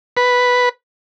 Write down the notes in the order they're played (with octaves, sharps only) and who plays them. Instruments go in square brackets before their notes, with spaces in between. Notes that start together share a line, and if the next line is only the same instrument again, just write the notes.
[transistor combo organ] B4